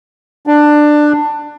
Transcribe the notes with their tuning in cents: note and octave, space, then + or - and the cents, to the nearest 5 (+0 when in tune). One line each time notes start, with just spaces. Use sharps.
D4 +15